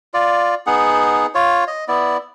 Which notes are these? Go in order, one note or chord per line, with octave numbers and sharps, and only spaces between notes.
F4 D5
B3 D#4 G#4 F#5
F4 C#5
D#5
B3 E4 D5